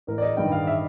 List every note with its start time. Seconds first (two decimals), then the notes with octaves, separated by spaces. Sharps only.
0.07 A1 A#4
0.18 D5
0.22 D#5
0.37 G2 D#3 G3 G5
0.52 F5
0.67 E5